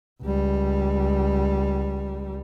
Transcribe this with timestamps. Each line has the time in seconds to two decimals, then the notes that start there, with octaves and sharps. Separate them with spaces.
0.23 C#2 G3